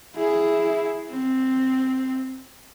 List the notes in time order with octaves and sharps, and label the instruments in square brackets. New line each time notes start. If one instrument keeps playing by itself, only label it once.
[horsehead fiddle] E4 G#4
C4